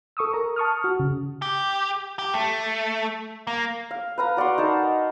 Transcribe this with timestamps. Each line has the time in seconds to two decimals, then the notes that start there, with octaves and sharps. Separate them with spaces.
0.17 A4 C#6 D#6 E6
0.33 A#4 A#5
0.56 A5 C#6 D#6 F6
0.84 F#4
1.00 C#3
1.42 G4
2.19 G4
2.34 A3
3.47 A#3
3.91 F5
4.18 B4 F5 A#5
4.37 F#4 D5 F#5 C6
4.58 D#4 A#4 A5